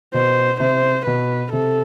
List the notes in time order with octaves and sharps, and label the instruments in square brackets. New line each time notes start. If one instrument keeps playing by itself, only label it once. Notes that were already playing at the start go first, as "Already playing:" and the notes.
[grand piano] B2 [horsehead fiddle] C5
[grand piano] C3 [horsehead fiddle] C5
[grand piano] B2 [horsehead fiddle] B4
[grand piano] C3 [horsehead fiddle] A4